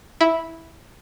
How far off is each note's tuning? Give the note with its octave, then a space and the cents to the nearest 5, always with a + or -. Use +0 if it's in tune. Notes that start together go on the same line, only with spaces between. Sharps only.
E4 -5